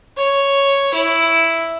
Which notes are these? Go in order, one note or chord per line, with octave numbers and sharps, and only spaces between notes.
C#5
E4